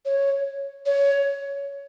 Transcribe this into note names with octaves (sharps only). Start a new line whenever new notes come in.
C#5
C#5